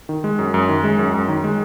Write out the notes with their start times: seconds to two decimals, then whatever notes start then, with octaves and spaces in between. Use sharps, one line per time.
0.09 D#3
0.24 G#3
0.39 F#2
0.54 F#2
0.69 D#3
0.84 G#3
0.99 F#2
1.14 F#2
1.28 D#3
1.44 G#3